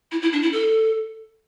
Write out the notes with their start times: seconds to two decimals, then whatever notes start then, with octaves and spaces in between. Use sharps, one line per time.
0.12 E4
0.22 E4
0.32 D4
0.42 E4
0.52 A4